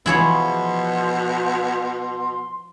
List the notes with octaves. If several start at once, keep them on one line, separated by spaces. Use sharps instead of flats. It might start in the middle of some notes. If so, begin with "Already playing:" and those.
B2 F3 E4 G#4 C#5 C6